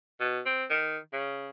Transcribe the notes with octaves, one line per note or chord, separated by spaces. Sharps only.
B2
C4
D#3
C#3